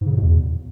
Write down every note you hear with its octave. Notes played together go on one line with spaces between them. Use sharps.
G#2
C#3
A2
B2
E2